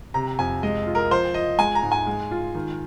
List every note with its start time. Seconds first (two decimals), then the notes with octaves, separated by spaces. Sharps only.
0.14 C3 A#5
0.39 F2 G#5
0.63 G#3 D#5
0.87 F4
0.95 A#4
1.11 F3 C5
1.34 F4 D#5
1.59 G#3 G#5
1.75 A#5
1.83 G#2
1.92 G#5
2.07 G#3
2.31 F4
2.55 D#3